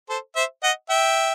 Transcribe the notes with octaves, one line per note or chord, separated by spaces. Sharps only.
A4 C5
C5 E5
D#5 F#5
E5 G5